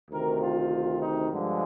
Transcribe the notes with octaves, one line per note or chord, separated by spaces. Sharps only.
D2 C3 D#3 A#4
F4
D#4
G2 D3 F3 G#3